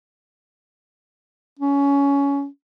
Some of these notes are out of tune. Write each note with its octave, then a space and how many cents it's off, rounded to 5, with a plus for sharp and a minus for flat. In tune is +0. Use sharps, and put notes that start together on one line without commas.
C#4 +20